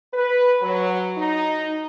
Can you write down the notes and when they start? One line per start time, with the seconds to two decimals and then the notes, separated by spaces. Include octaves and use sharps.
0.13 B4
0.62 F#3
1.17 D#4